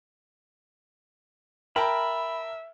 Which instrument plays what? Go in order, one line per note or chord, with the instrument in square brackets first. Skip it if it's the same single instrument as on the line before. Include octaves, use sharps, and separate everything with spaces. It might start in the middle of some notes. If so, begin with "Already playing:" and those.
[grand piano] A#4 G5 A5 [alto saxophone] E5 [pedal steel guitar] B5